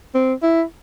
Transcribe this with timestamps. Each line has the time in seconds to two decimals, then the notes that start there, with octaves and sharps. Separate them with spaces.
0.15 C4
0.43 E4